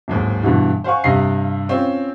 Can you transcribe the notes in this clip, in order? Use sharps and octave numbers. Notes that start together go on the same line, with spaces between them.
D1 D#2 G#2
G2 B2 D3 E3
C5 F5 F#5 G#5 C#6
G2 C3 D#5 F5 C7
C4 C#4 F4